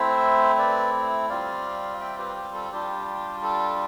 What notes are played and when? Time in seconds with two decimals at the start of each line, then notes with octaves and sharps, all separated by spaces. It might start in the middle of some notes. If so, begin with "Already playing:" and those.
Already playing: A3 C4 E4 C5 E5
0.58 B4 D5
1.29 G3 C4 F4 D5 F5
2.00 E5 G5
2.18 G4 B4
2.36 G4
2.54 A4
2.72 G3 D4 F4 G4
3.43 A4